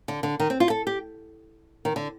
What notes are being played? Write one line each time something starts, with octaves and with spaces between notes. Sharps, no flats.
D3
D3
D#3
C4
F4
A4
G4
D#3
D3